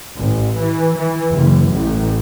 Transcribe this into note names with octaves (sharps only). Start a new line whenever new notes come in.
A1
E3
E3
F#1
A1